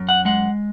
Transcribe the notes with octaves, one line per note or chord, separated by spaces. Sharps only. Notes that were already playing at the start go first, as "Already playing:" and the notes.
Already playing: F#2
F#5
G#3 F#5